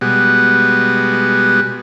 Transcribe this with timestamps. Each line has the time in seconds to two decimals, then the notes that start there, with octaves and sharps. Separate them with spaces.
0.01 B2 G3 G#3 F#4